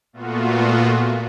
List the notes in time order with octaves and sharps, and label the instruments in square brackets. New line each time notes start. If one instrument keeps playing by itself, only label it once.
[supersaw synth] A#2 A3 B3 F4 F#4